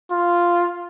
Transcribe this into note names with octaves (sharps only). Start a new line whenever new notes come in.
F4